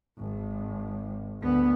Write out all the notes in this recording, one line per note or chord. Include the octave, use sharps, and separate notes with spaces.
G#1
D2 B3